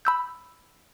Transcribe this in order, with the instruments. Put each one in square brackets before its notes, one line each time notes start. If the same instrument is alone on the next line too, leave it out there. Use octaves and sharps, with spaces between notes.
[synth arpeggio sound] B5 E6 G6